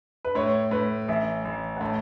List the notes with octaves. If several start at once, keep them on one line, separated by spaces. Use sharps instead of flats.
B4
A2 C#5
A2 B4
A1 E5
A1
F#5
A2 A5